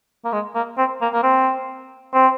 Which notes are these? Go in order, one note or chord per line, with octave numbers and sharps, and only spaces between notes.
A#3
G#3
A#3
C4
A#3
A#3
C4
C4